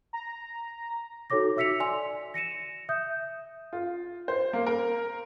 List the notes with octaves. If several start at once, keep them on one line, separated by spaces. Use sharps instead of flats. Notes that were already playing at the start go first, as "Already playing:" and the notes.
A#5
D#4 F#4 A4 C#5 D6 A#6
F#4 E5 E6 B6 C#7 F7
D5 G#5 C6 F7
A#6 C#7 D#7 E7
E5 D#6 G6
F4
C5
A#3
A#4